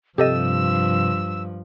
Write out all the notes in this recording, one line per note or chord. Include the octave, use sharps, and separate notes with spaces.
G2 C3 F3 G4 A4 D#5 E6